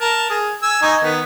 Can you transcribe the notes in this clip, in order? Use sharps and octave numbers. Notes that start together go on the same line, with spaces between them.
A#4 A5
G#4
G#5 E6
D#4 G#5 C#6
D#3 B3